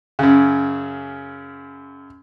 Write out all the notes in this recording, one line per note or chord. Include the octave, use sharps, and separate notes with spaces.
F#2 C#3